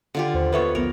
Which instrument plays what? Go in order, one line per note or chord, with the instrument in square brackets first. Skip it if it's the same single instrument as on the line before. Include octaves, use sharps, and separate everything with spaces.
[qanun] D3 F4 G4
[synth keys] D#2 C5
[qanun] B3 A4 C#5 [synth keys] B4 E5 C#6
[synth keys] A#1 B3 [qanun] A#4